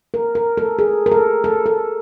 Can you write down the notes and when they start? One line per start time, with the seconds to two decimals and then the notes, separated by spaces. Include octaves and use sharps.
0.14 A#4
0.35 A#4
0.57 A4
0.79 G#4
1.06 A#4
1.12 A4
1.44 A4
1.66 A4